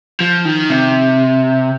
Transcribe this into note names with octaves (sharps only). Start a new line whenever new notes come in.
F3
D#3
C3